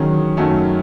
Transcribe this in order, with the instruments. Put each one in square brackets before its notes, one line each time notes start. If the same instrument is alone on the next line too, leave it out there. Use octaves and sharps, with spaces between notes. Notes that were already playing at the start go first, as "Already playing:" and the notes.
Already playing: [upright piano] D#3 [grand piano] F#3 C#4 G#4
[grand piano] F#2 D#3 F#3 A3 C#4